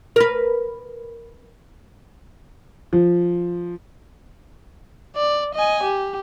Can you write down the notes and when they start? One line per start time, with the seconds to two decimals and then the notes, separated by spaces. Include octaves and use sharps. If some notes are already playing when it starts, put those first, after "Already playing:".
0.16 A#4 B4
2.93 F3
5.16 D5
5.55 D#5 G#5
5.83 G4